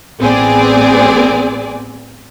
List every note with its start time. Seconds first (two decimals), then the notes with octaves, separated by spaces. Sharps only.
0.20 A1 B3 C4 G#4 D5